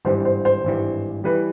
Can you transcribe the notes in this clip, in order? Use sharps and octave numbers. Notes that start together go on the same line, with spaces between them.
G#1 G2 E3 G3 C5
C5
C5
G#1 G2 E3 G3
E3 G3 B4